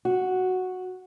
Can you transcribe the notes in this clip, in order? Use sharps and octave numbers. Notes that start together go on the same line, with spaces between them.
F#4